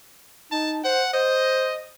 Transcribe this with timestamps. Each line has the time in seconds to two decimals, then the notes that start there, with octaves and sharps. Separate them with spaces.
0.52 D#4 A5
0.84 C5 F#5
1.13 C5 D#5